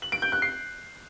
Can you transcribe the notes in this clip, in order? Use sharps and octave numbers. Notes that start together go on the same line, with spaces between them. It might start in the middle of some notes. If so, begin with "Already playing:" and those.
F#7
D7
G6
F#6
C7